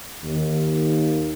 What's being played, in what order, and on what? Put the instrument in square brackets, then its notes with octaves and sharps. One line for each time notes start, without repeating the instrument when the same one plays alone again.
[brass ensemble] D#2